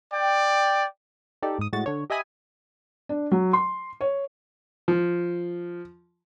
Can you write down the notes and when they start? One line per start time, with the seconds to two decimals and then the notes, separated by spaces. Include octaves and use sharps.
0.13 D5 G5
1.42 D#4 G4 A4 D5
1.59 G#2 D#6
1.73 A2 G#3 F#4 A6
1.86 D3 C#5
2.10 G4 D#5 E5 G#5 B5 D#6
3.09 D4
3.32 F#3
3.53 C6
4.01 C#5
4.88 F3